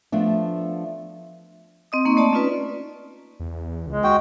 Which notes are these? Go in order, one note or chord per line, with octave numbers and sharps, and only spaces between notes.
F3 A3 B3 D4
C4 D#5 D#6
A#3 D#4 C6 C#6
A3 D5 A5
C#4 D#4 F4 B4 D5
E2
C#2 G#3
D#2 F#4 G5